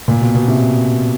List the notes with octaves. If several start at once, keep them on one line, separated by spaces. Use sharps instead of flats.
A#2
B2
B2
C3